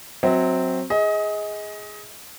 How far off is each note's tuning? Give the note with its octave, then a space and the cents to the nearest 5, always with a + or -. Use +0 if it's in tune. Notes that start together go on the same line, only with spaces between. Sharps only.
F#3 -10 C4 +0 E5 -45
G#4 +0 D#5 +25